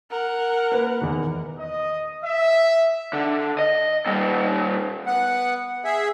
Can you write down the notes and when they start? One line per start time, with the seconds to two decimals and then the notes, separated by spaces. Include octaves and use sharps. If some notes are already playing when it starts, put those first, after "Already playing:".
0.10 A#4 F#5
0.71 A#3 B4
1.01 E2 D#3
1.58 D#5
2.23 E5
3.13 D3
3.59 D#5
4.06 A#2 G3
5.07 B3 F#5
5.85 G#4 E5